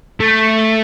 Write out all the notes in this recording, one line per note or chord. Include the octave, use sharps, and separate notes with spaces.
A3